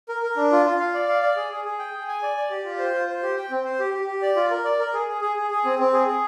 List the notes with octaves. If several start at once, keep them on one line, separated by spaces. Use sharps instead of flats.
A#4
A#4
D4
F4
F4
F5
D5
F5
D5
G#4
G#4
G#4
G5
G#4
G#5
D5
D5
G4
F4
C5
F4
C5
G4
G5
C4
C5
G4
G4
G4
D5
F4
A#4
D5
A#4
G#4
G#4
G#4
G#4
G#4
C4
C4
G#4
G#4